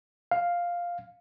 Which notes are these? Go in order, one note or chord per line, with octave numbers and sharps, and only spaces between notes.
F5